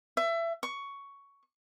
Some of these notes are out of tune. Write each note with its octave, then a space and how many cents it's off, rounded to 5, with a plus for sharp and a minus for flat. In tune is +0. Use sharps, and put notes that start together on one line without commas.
E5 +25
C#6 +10